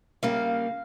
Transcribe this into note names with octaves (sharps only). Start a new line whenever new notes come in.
C#3 G3 A#3 F5